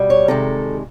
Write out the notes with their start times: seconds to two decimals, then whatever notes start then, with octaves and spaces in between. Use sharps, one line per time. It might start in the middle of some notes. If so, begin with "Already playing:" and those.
Already playing: B2 G3
0.10 C#5
0.28 C3 D#3 G#3 A4